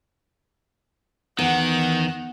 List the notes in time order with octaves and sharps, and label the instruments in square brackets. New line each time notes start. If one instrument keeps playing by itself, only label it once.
[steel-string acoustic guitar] E2 [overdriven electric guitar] D#3 [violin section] F#5